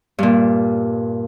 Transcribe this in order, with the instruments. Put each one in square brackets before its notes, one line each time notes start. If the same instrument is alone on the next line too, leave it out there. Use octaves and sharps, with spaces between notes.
[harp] G2 A#2